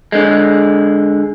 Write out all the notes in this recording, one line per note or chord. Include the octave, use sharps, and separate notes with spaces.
D3 G#3